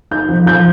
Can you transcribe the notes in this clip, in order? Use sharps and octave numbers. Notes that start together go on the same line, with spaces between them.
D#4 G6
F3
F3 G6